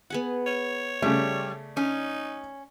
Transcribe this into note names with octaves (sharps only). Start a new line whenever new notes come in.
B3 G#4 F#5
C#5
C#3 G3 A3
C#4 D#4